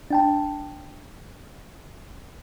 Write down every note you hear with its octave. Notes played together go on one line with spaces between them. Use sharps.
D4 G5 A5